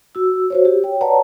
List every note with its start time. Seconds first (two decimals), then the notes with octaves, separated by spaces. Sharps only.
0.15 F#4 E6
0.50 F#4 C5 C#5
0.65 G4
0.84 C#5 G5
1.01 B4 C#5 D5 F#5 A5 A#5